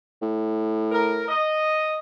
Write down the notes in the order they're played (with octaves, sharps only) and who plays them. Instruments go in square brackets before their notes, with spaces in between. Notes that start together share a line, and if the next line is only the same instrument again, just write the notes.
[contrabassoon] A2
[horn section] A#4
D#5